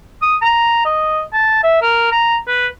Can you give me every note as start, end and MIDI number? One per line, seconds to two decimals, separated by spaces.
0.22 0.37 87
0.42 0.82 82
0.85 1.22 75
1.33 1.61 81
1.64 1.79 76
1.82 2.11 70
2.11 2.37 82
2.47 2.67 71